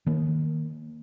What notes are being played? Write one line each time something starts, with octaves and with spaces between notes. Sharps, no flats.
D#3 A#3